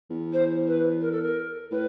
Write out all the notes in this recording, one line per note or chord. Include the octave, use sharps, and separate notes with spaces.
E2
C5
B4
A#4
A4
A#4
A2 B4